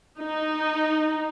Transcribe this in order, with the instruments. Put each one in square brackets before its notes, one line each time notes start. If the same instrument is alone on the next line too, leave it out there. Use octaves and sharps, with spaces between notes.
[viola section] D#4